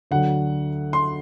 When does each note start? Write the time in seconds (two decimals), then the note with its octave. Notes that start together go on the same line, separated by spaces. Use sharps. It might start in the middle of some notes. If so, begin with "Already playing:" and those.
0.11 D2 D3 F#3 F#5
0.93 C6